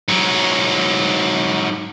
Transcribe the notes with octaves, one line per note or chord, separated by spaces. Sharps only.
G#2 F#3